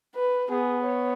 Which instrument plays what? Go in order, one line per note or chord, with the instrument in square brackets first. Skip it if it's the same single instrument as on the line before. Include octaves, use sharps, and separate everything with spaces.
[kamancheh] B4
[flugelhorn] B3 [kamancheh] G#4
[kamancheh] C#5